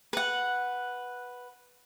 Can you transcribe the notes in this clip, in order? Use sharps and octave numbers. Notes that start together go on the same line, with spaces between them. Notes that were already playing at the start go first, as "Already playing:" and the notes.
B4 F#5